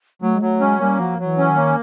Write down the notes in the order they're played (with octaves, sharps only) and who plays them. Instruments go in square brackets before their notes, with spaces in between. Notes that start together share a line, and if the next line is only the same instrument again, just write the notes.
[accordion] F#3 [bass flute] A3
[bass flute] G#3
[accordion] F#3 [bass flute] A3
[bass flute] G#3 [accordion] C#4
[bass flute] G3 [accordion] A#3
[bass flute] F3 [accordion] F#3
[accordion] F#3
[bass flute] E3
[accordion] C#4
[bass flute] D#3
[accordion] A#3